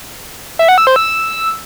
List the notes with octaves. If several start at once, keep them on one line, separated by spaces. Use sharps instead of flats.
E5
F#5
E6
C5
E6